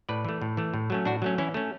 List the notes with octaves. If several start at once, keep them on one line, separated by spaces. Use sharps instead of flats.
A2 B4 D5
E3 A3
A2
E3 A3
A2
F#3 A3 C#4
A2 D4 F#4
F#3 A3 C#4
E3 C#4 E4
A3 C#4